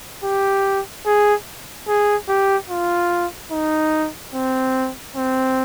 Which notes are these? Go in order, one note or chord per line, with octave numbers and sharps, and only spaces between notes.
G4
G#4
G#4
G4
F4
D#4
C4
C4